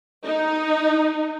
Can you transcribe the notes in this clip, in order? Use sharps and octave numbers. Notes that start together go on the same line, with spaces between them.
D#4